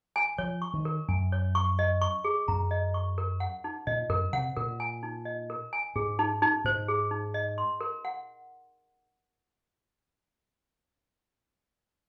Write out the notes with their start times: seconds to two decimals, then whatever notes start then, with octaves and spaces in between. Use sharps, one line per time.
0.16 G#5
0.38 F3 C#5
0.62 C#6
0.74 D#3
0.85 A#4
1.08 F#2 G#5
1.32 C#5
1.55 C#6
1.79 D#5
2.01 C#6
2.24 G#4
2.48 F#2 A#5
2.71 D#5
2.94 C#6
3.18 A#4
3.40 F#5
3.64 D#4
3.87 A#2 D#5
4.09 F#2 A#4
4.33 C3 F#5
4.57 A#2 A#4
4.80 G#5
5.03 D#4
5.25 D#5
5.50 A#4
5.73 G#5
5.96 G#2 G#4
6.19 D#4
6.42 D#4
6.65 G#2 C5
6.88 G#4
7.11 D#4
7.34 D#5
7.58 C6
7.81 A#4
8.05 F#5